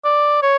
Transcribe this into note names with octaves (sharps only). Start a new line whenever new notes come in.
D5
C#5